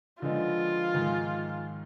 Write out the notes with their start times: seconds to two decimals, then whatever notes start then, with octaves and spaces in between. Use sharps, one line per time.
0.22 D3 F3 G#3 B3 D#4 F4
0.94 G#2 D#3 G#3